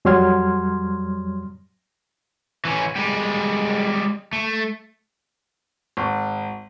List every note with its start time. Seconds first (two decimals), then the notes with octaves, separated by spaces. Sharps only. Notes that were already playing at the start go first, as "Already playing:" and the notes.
0.05 F2 F#3 G3 C6 F6 G#6
2.65 E3 C#4
2.96 G3 G#3
4.33 A3
5.97 G#1